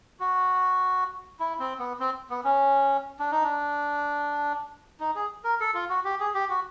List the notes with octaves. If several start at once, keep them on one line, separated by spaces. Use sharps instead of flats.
F#4
E4
C4
B3
C4
B3
C#4
D4
D#4
D4
D#4
G#4
A#4
A4
F4
F#4
G4
G#4
G4
F#4